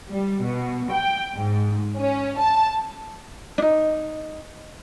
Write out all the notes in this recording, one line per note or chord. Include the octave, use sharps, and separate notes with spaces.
G3
B2
G5
G#2
C#4
A5
D4 D#4